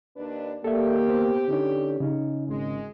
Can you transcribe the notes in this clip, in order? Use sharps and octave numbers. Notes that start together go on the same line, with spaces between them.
D#2 D4 B4
A#3 G4 A4 D5 E5
B3 C5 G5
D3 C#4 D#4 C#5
C#3 C#4 D#4
G#1 G#3